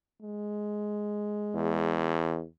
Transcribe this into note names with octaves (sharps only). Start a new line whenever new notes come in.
G#3
E2